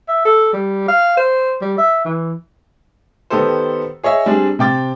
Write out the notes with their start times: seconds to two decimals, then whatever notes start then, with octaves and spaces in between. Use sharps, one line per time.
0.08 E5
0.25 A4
0.53 G3
0.88 F5
1.17 C5
1.62 G3
1.78 E5
2.05 E3
3.30 D#3 B3 D#4 G4 A4 C5
4.03 G#4 C#5 D#5 E5
4.26 G3 C4 D4 G#4
4.59 C3 C4 G5 D6 A6